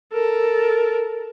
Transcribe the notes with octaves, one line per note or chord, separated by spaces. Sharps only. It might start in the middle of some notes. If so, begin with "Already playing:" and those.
A4 A#4